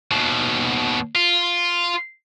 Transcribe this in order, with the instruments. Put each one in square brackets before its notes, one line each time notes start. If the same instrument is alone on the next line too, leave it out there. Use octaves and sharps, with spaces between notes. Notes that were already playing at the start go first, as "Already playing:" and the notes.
[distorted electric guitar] D#2 B2
F4